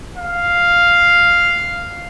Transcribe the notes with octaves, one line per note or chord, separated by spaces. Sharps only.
F5